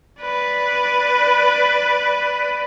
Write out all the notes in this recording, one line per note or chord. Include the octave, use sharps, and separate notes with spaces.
B4 D5